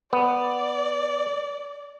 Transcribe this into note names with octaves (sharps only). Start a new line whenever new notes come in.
B3 D5